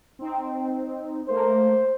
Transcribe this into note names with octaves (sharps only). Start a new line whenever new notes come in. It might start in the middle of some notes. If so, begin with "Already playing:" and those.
C4 D#4
A3 A#3 C5